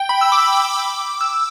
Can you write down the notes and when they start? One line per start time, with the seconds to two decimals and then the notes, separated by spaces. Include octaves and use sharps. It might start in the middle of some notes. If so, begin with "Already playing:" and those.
Already playing: G5
0.09 B5
0.21 E6
0.32 D6
1.21 E6